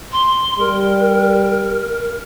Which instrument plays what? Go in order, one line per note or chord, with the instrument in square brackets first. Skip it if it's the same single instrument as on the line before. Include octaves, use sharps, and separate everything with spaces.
[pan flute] C6
[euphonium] G3 [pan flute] A#4